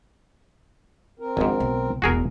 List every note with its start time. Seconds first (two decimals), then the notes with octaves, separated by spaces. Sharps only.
1.20 C4 A#4
1.37 G#1 G#2 F3 D4
1.60 B1
2.02 E1 A1 F#4 G#4 A#4